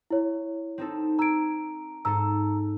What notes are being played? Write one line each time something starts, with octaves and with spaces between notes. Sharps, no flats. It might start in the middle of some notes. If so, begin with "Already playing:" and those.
E4 C#5
C4 D#4 A4
A#5 E6 G#6 D7
G#2 A4 A#5 E6